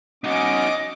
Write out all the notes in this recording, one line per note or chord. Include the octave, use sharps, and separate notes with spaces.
C#4 D#4 F#4 D#5 D6